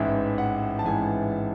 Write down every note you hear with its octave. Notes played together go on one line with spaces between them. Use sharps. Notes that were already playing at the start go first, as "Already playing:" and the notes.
Already playing: A1 G#2 E3 E5
F#5
A5
A1 G#2 E3 G#5